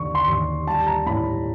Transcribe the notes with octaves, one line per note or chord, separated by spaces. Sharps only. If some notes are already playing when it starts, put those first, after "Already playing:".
Already playing: D#2 D3 C#6
C6
D#2
G3 A5
A#5
A2 B5